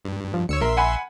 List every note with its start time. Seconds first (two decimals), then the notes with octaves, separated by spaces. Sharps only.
0.05 G2
0.34 F3
0.49 D2 C#5 E6 C#7
0.61 A#1 A#4 E5 C6
0.77 F#5 G#5 B5